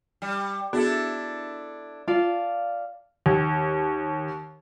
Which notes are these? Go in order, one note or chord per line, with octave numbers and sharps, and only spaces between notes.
G3
B3 D4 E4 F#4 G#4 A4
F4 D5 F5 A5
D#2